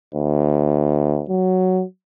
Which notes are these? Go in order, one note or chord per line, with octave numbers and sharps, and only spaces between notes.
D2
F#3